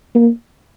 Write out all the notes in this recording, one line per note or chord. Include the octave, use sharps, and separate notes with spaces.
A#3